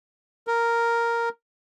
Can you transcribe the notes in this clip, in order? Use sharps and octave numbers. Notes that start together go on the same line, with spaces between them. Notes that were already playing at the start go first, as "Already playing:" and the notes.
A#4